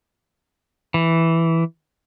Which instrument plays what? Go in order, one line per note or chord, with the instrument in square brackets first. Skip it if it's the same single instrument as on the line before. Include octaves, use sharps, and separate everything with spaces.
[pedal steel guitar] E3